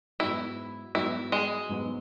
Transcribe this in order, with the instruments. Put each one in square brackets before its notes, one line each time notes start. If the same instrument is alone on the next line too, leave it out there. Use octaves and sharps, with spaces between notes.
[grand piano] G#2 F#3 B3 F#4 [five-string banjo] E4
[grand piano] G#2 F#3 B3 F#4 [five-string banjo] E4
[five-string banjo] G#3
[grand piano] G#2 F#3 B3 F#4